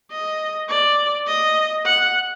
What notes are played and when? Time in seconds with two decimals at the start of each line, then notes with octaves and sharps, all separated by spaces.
0.12 D#5
0.70 D5
1.28 D#5
1.86 F#5